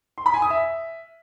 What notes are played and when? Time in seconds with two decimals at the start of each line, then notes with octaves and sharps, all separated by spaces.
0.18 C6
0.26 B5
0.34 G#5
0.42 D#6
0.50 E5